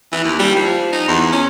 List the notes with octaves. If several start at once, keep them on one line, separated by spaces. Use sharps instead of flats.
E3
D#2
G3
F3
D#4
E2
C#4